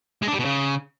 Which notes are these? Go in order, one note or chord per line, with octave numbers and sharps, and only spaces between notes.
G#3
D4
G3
B2
C#3